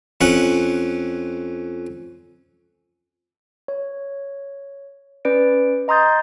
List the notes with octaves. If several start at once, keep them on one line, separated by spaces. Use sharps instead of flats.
F2 C#4 F#5
C#5
C#4 B4 D5 D7
D#5 A#5 C6 D#6 G6 A6